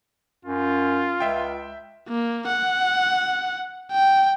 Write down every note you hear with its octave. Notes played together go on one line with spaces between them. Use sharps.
F#2 F4
C#2 E5 G5
A#3
F#5
G5